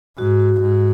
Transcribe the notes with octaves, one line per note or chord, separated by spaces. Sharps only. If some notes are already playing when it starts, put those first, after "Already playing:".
G#2 F#4
F#4
G#2